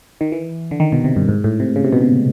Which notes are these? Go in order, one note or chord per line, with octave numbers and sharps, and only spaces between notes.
D#3
E3
D3
D#3
B2
C3
G2
G#2
A2
C3
C#3
C3
B2
C3